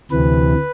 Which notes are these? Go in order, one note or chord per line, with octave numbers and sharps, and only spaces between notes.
D2 C3 E3 B4